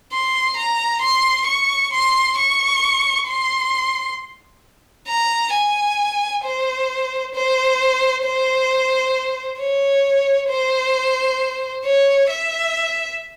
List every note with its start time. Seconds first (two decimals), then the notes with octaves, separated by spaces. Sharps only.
0.13 C6
0.57 A#5
1.02 C6
1.47 C#6
1.93 C6
2.38 C#6
3.28 C6
5.08 A#5
5.54 G#5
6.44 C5
7.34 C5
8.24 C5
9.60 C#5
10.50 C5
11.85 C#5
12.30 E5